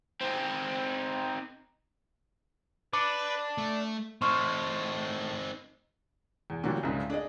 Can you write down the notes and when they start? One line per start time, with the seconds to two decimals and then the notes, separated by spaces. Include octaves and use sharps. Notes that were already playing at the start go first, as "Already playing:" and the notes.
0.21 C4 D#4
2.93 D4 B4 D6 C#7
3.58 A3
4.22 A2 C4 D#4 C6 C#6 F6
6.50 E2
6.64 A#2 D3 E3 F#3 G3
6.83 C2 F2 G#2 C#3
7.10 D4 G#4 D5 D#5